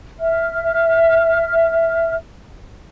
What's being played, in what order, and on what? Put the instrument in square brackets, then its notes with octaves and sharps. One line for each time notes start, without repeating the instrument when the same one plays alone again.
[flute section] E5 F6